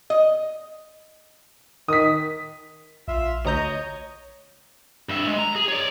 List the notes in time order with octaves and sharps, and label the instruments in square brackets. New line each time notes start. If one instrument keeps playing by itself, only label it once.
[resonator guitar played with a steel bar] D#5
[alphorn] D#3 [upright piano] D#6 B6
[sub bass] A#1 [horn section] F4 E5
[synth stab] D2 A#5 G6 [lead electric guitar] C#5 [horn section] D#5
[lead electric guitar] G2 E5
G#3
A#5
G#4
C#5 D5